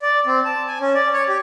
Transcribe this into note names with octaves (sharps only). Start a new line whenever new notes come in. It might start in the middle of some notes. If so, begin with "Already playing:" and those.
D5
C4
A5
G#5
C#4
D5
C#5
G4